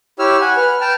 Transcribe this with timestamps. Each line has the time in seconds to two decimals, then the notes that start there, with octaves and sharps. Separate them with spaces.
0.19 E4 G4 C#5 E6 F6
0.41 F#5 G#5
0.57 B4 F6
0.81 G5 A5 F6